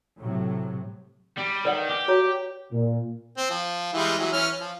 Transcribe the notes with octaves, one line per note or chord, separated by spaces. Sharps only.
A2 C3 F#3
G3
D#3 B4 D5 F#5
G4
F#4 C#5 A#5
A#2
C4
F3
E3 G3 G#3
E3 F#3
E3 C#4 F6
F3